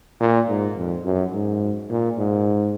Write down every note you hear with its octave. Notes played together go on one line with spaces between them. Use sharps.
A#2
G#2
F2
F#2
G#2
A#2
G#2